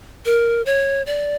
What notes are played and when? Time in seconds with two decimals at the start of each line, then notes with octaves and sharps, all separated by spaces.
0.26 A#4
0.66 C#5
1.06 D5